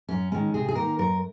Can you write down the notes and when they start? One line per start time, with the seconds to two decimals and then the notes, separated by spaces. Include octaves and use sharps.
0.09 F#2 C#4
0.32 D#3 G#3 C#4
0.54 C3 G#4
0.68 G#4
0.75 D#3 A#3 A#4
0.99 F#2 A#4